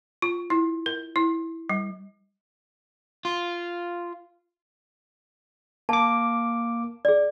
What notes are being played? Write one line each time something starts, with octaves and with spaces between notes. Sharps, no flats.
F4
E4
A#4
E4
G3
F4
A#3 A5 D6
G#4 D5